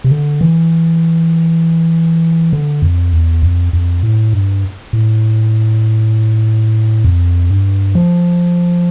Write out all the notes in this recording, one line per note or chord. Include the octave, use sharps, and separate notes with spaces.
C3
D3
E3
D3
F2
E2
F2
F2
A2
G2
A2
F2
G2
F3